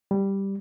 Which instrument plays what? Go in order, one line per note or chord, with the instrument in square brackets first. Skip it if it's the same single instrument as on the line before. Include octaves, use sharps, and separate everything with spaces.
[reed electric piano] G3